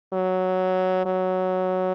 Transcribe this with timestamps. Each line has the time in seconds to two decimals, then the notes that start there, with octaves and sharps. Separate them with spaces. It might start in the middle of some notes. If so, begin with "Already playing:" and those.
0.13 F#3
1.06 F#3